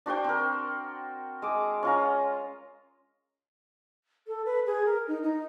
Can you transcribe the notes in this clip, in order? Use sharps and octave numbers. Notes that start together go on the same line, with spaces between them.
D4 F#4 C5 G5
C4 A#4
G#3 D6
C#4 F4 A#5
A4
B4
G#4
A#4
D#4
D#4